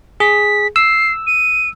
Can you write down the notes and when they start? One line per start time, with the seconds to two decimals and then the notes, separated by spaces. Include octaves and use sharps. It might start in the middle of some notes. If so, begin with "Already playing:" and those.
0.20 G#4 B6
0.76 E6 C7
1.27 D#7